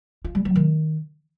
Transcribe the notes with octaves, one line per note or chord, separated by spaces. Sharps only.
F4
G3
F#3
D#3